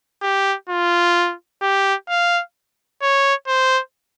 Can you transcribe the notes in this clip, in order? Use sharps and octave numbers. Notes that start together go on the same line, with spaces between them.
G4
F4
G4
F5
C#5
C5